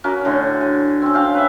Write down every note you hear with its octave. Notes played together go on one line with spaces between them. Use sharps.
C#4 F#4 A#4 D6
A2 D3 C6
G#5
C4 C#4
C#4 F5 G5
B4 E5